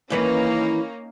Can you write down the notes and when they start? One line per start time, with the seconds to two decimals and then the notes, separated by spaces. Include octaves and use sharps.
0.10 D#2 E3 A#3 C#4 D#4 B4